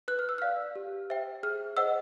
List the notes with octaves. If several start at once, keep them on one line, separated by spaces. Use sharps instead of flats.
B4 F#6
F6
E6
D5 F5 F6
G4
C5 E5 G5
G#4 F6
C5 D#5 F#5 E6